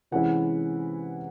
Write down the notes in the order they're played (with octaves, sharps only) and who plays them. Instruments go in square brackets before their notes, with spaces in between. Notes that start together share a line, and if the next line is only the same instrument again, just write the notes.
[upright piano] C3 E3 G#3 C#4 E4 F#5